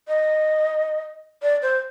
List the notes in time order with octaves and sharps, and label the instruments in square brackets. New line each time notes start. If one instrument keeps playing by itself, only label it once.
[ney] D#5
D5
C5